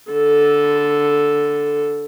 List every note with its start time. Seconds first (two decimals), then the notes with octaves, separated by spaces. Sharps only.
0.12 D3 A4